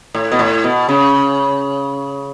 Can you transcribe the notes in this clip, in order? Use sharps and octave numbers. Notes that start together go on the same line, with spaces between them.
A2
B2
A2
B2
C#3